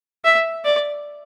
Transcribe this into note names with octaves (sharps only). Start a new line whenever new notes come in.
E5
D5